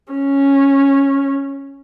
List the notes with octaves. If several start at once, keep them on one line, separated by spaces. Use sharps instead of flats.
C#4